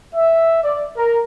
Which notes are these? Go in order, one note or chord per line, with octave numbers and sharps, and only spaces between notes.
E5
D5
A#4